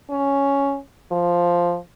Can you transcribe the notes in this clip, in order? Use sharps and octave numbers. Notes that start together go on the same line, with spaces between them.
C#4
F3